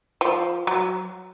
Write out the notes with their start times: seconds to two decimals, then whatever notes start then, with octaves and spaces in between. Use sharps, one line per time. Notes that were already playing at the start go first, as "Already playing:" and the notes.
0.21 F3
0.67 F#3